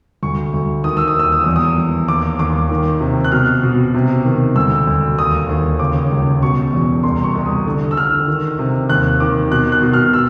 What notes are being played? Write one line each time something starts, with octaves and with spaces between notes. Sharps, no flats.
D2 C#6
D2
D#3 D#6
E6
D#6
D#2 E6
D#6
E2 E6
D#6
E3
D#2 D6
D#2 D6
D#3
C3
F#6
B2 F6
B2
C3
D#3
D2 E6
D2
D#2 D#6
D#2
C#3 D6
C#2
B2 C#6
E2
C2 C6
C#6
C2
D#6
D3
E6
D3 F6
D#3
C3
D#2 F#6
D#3 D6
B2 F#6
F#6
B2
F6
E6